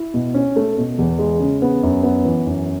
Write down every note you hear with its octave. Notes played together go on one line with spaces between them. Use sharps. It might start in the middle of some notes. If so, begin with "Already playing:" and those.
Already playing: E4
B2
C#4
A3
B2
E2
G#3
C#3
B3
F#2
B3
E3
F#2